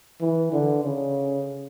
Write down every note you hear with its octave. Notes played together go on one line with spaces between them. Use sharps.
E3
D3
C#3